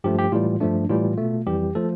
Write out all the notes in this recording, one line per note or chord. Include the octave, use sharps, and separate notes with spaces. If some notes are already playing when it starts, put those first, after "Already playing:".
G2 F3 A3 G4
G4
A2 E3 G3 F4
G2 F3 A3 D4
A2 E3 G3 F4
B2 A3
F2 E3 G3 G4
F3 A3 A4